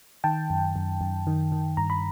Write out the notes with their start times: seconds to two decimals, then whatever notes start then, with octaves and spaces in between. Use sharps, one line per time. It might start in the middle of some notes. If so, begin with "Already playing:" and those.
0.24 D#3 G5 A5
0.50 F#2
0.76 F#2
1.01 F#2
1.27 D#3
1.52 D#3
1.77 G2 A#5
1.90 B5